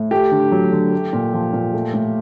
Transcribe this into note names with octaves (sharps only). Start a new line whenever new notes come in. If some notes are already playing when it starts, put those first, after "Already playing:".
Already playing: A2
A3 G4
D3
F#3
D3
A3
A#2
F3
A#2
A3
A2